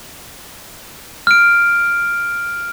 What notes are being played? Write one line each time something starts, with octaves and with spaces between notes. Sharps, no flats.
F6 D7